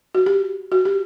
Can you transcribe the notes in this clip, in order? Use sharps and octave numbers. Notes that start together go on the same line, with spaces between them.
F#4
G4
F#4
G4